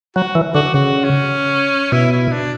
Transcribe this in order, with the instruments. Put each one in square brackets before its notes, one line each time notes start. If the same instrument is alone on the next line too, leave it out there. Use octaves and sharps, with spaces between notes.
[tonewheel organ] F#3 [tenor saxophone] F#4
[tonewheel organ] E3
[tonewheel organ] D3 [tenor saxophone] F#4
[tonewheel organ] C#3 [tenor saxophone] F#4
[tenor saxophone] C#4
[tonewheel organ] B2 [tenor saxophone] E4
[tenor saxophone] E4
D4